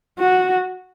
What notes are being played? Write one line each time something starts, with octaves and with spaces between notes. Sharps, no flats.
F#4